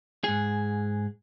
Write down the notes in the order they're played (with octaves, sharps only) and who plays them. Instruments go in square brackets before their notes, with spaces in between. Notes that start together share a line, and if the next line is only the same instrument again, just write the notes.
[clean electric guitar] G#2 G#4